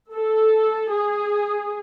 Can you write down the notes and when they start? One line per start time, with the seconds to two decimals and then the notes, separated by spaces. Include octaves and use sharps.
0.13 A4
0.91 G#4